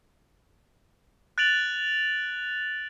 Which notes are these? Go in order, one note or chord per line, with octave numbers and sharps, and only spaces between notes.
F#6 A6 D7 F7 F#7